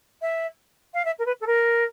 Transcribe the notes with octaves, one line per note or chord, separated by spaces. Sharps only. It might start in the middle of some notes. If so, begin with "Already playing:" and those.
E5
F5
E5
A#4
B4
A4
A#4